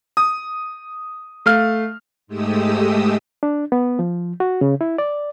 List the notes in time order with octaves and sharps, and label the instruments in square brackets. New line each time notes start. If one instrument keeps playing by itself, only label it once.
[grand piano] D#6
A3 F5 F6
[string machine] G#2 G#3 A3 G4 D#6 E6
[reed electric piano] D4
B3
F3
F#4
C#3
E4
D5